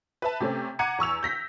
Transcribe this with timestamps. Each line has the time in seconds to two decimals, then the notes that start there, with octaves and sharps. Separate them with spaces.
0.22 B4 E5 A5
0.40 C3 A3 C4 C#4
0.79 F#5 A#5 D6 G#6 C#7 D#7
0.99 E2 C#6 E6 F7
1.23 G6 A#6 B6